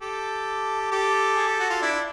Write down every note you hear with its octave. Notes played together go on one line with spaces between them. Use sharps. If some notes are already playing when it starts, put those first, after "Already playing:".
G4 A4
G4 A4
G#4
G4
F#4
F4
D4 E4